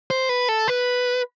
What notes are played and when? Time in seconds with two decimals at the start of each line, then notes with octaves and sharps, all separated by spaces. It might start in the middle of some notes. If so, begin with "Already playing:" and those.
0.11 C5
0.29 B4
0.49 A4
0.68 B4